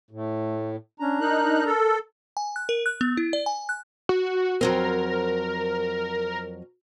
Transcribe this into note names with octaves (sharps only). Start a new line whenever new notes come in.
A2 A3
C#4 D4 A#5
D#4 A#4 F#6
A4
G#5
F#6
A#4
F#6
B3
E4
D5
G#5
F#6
F#4
F2 F#3 C4 A#4